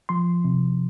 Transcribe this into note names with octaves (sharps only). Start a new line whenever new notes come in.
F3 C6
C3